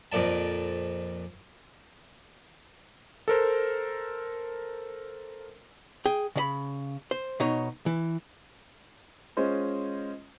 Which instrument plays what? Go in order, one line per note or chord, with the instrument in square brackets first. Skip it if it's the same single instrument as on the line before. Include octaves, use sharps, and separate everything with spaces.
[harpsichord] F2 A#2 D5 A5
[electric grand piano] A4 A#4 C5
[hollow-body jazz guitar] G#4 G5
C#3 D5 B5
C5
B2 D#4 C#5
E3
[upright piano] G#3 C#4 F4 C5 D#5